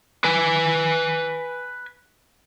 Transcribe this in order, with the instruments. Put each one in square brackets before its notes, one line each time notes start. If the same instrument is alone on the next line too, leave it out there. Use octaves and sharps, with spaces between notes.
[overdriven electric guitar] B4 G#5